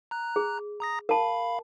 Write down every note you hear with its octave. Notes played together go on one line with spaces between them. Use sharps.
A#5 F#6
G#4
A#5 D#6 A#6
A#4 F5 A5 B5